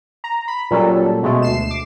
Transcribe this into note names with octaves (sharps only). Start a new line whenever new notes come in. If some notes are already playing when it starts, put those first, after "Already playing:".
A#5
B5
A#2 F#3 G3 C#4 A4
B2 G#3 A3
D2 C7 E7
D6